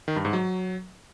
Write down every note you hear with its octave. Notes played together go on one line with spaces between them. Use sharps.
D#3
G2
G#2
F#3